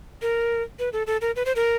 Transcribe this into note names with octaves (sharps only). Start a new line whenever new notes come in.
A#4
B4
A4
A4
A#4
B4
C5
A#4